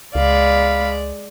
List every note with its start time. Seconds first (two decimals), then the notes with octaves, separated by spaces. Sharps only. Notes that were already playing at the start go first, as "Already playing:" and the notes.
0.15 C#2 G#3 D5 F5 B5